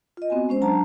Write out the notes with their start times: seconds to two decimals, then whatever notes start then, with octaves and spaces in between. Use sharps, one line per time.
0.17 F4 D#5
0.30 B3 C4 F#4 G#5
0.49 G#3 C#4 C5
0.62 F#3 D4 A5 A#5